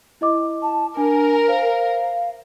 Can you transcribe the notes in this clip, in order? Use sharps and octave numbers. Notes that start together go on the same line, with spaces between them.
E4 D#5 D6
A5
D4 A#4 G#5
C5 F5